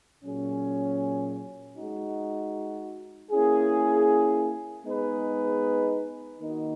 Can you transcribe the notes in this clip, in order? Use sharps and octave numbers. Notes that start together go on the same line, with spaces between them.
A#2 F#3 C#4 G#4
G#3 D#4 F#4
A#3 C#4 E4 G#4
G#3 B3 D#4 G#4 B4
D#3 A#3 D#4 F#4